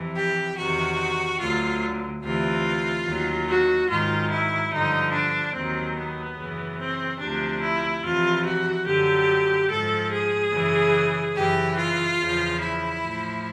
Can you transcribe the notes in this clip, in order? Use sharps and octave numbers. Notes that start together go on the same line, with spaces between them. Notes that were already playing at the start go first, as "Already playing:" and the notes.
Already playing: F2 C3 E3
G4
E2 C3 D#3 F#4
D2 D3 F#3 F4
D2 C3 E3 F4
D#2 D#3 F#3
F#4
G#2 D#3 F#3 F4
E4
G2 D3 F3 D#4
D4
D#2 D#3 F#3 C4
B3
F#2 C#3 E3
C4
D2 C3 F3 D4
E4
F2 C3 E3 F4
F#4
F#2 D3 F#3 G4
G#2 F3 A4
G#4
F#2 C#3 E3
F#2 C#3 E3 G4
F4
E2 C#3 F3
E4
A2 F3